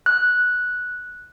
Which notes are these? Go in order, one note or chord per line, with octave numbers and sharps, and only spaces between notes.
F#6